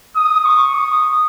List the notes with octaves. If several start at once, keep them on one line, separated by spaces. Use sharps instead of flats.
D#6
C#6
D#6